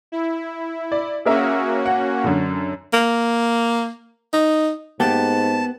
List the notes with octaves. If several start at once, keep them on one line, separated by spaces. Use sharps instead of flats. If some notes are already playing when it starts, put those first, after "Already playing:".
E4
D5
A#3 C#4 F#4 G#4 A#4 E5
F#5
F#2 D3
A#3
D#4
G#2 A#3 B3 G4 A5